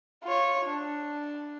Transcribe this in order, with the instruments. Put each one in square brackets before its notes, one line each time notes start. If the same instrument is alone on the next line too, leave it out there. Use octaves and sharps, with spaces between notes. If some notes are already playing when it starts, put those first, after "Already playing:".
[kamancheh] F4 C#5
D4